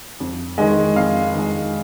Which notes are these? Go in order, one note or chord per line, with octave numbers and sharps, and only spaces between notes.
F2
D#3 G#3
F2 F5
D#3 G#3